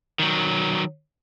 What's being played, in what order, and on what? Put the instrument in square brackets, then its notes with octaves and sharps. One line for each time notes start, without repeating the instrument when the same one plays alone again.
[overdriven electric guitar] D#3 F#3